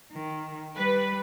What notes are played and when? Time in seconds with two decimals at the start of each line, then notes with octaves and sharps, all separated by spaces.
0.12 D#3
0.77 G3 B4